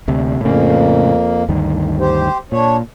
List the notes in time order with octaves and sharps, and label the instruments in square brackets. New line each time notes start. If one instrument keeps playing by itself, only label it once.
[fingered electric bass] D2 C3
[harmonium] F2 A#3 [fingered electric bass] A2 C#3
[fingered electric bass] D2 G2 D#3
[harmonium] G4 C5
[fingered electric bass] A#2 [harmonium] D4 C#5